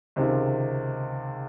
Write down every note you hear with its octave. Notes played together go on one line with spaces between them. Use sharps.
C#2 C3 D#3